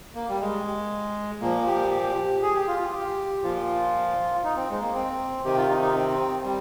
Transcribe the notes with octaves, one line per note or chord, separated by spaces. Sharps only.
A#3
G3
G#3
A#2 F3 A#3
G4
G4
G#4
G4
F4
F4
G4
A#2 F3 F4
D#4
C4
G#3
A#3
C4
C3 D#3 G4
F4
D#4
D#4
C4
G3